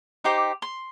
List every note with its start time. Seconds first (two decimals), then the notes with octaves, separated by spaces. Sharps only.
0.24 D#4 G4 C5 D6
0.62 C6